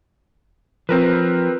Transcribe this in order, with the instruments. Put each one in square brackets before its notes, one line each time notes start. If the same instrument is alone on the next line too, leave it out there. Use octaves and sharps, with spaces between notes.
[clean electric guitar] F3 [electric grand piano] C4 A#4 B4